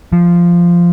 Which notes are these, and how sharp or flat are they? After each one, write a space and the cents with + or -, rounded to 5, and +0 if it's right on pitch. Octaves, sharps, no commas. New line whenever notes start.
F3 -10